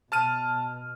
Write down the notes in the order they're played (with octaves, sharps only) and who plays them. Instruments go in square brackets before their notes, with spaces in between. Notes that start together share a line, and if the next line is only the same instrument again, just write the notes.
[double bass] B2 [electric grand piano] A5 F6 D#7